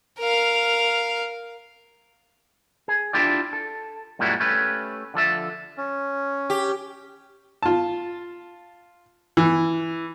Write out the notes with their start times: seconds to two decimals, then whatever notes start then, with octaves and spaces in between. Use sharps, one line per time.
0.19 A#4 F5
2.88 G#4
3.13 D4 E4 F4 G4 D5
3.53 A4
4.19 F#2 A#2 G3 G#3 E4 F#4
4.40 A3 C#4 G4 B4
5.14 D3 F3 A4 E5
5.78 C#4
6.50 G4
7.63 F4 A5
9.37 E3